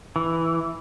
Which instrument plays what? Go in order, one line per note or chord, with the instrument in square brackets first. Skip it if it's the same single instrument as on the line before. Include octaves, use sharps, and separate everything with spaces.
[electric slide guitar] E3